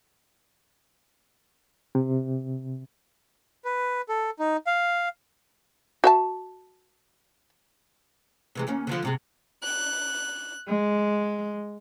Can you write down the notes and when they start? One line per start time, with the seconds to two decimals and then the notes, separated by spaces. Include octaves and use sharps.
1.95 C3
3.65 B4
4.09 A4
4.39 D#4
4.67 F5
6.04 F#4 E5 A5
8.55 C3 E3 G#3
8.67 D#2 A#3 C#4
8.87 D3 E3 F3
9.03 G#2 C3 G#3
9.63 F#6
10.67 G#3